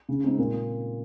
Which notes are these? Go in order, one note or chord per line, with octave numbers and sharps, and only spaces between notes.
C#3
G#3 C4 D#4
A#2